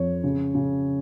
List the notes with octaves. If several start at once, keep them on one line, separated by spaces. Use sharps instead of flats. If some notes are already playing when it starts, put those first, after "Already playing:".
Already playing: F2 C#5
C#3
C#3